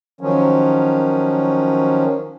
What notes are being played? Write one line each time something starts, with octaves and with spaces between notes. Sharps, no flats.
D#3 F3 F#3 C#4